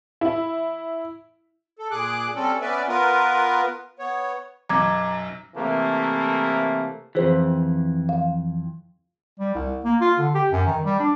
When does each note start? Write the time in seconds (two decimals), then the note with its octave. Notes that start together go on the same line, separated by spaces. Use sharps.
0.21 E4
1.79 A4
1.91 A#2 G#4 D6 F#6
2.35 G3 C4 C#4 A4
2.61 B3 C#4 B4 D5 E5
2.88 B3 F4 A#4 B4
3.99 B3 C#5
4.69 B1 F#2 A#5 D6 G#6
5.55 C3 E3 A3 A#3
7.15 F2 E3 F4 G#4 C5
8.09 F5
9.40 G3
9.55 C2
9.85 A#3
10.01 F4
10.19 D3
10.34 G4
10.52 F#2
10.67 D#3
10.84 G3
11.00 D4